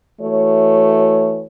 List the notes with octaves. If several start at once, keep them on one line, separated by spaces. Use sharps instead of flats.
E3 A3 F#4 C#5